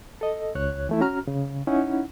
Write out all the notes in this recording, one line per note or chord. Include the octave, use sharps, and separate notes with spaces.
A4 D#5
C#2 C#5 F#6
E3 A3 E4
C#4 F#4 A#5 F6
C#3
C#4 D#4 E4 F#5